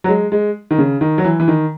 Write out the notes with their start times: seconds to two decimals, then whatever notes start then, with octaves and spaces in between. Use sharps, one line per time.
0.04 F#3
0.08 G#3
0.32 G#3
0.71 D#3
0.78 C#3
1.01 D#3
1.18 F#3
1.24 E3
1.40 E3
1.48 D#3